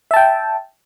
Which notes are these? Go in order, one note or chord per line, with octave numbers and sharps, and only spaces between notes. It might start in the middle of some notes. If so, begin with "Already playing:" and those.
E5 G5 A5